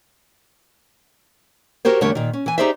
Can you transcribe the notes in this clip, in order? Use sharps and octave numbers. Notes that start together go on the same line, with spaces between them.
F#4 G4 A#4 C5 C#5
E2 D3 G3 A3 A#4 C#5
A#2 D#3
C#4
E3 G#5
D#4 G4 G#4 C5 D5 E5